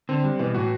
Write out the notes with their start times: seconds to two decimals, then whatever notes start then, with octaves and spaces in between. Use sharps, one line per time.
0.09 D3 C4
0.24 G3
0.39 B2 E3
0.54 A2 F#4